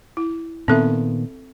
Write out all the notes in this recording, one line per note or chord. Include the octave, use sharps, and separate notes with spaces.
E4
A#2 D#3 B3 C4 A4 E5